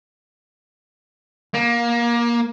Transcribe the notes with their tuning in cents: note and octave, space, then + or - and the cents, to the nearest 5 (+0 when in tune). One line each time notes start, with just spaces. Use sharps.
A#3 +20